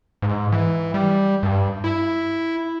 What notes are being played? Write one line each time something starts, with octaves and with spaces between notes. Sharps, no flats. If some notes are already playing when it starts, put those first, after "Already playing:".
G#2
E3
G3
G2
E4